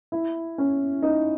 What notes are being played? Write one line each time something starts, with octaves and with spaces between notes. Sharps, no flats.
E4
C#4
D#4